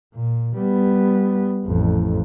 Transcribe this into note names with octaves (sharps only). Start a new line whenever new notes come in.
A#2
G3 B3
A1 F2